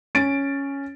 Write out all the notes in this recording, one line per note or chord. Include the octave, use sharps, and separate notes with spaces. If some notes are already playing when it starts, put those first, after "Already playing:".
C#4 A6 D7